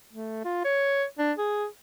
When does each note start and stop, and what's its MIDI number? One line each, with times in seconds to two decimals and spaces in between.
0.13 0.41 57
0.45 0.60 65
0.64 1.04 73
1.19 1.33 62
1.37 1.66 68